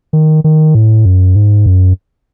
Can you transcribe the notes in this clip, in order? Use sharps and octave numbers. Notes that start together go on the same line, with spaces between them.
D#3
D#3
A2
F#2
G#2
F#2